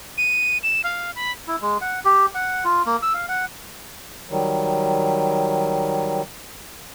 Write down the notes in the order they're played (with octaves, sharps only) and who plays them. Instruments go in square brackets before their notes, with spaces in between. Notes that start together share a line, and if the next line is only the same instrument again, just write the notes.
[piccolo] D#7
E7
F5
B5
[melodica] E4
G#3
F#5
G4
F#5
F4
A#3
E6
F5
F#5
[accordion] D#3 F#3 G3